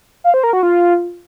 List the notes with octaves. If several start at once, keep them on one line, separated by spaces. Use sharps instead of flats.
F5
C5
A#4
F#4
F4